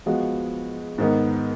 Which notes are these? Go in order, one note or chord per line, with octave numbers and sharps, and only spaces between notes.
F3 G#3 B3 F#4
G#2 D#3 G#3 B3